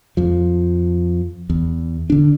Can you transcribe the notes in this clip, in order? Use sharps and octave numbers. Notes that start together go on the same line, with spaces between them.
F2 F3
E2
D3 D4